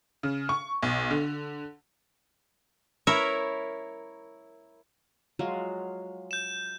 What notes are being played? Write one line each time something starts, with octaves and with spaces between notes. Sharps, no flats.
C#3
C#6
B1
D3
E4 A#4 C#5 E5
F#3 G#3 F4 F#4 F5
G6 E7